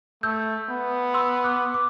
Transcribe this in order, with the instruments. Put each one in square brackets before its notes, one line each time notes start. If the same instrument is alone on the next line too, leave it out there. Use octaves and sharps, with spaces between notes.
[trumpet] A3 [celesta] E6 G6
[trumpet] B3
[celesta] C6 E6
D6 F#6
D6